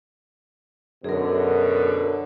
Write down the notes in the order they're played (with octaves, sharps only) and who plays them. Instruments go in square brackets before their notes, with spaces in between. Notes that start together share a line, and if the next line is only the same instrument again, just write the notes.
[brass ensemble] F#2 B2 D3 [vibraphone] G#4 A#4